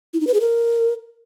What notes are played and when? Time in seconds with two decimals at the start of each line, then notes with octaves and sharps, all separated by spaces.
0.14 E4
0.20 D#4
0.27 B4
0.34 G#4
0.41 A#4